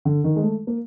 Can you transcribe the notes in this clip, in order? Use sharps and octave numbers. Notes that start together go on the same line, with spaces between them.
D3
D#3
G#3
A3
A#3